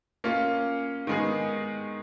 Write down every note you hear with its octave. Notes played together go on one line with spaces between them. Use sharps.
A#3 C#4 F4
D#3 G#3 B3 D#4 G#4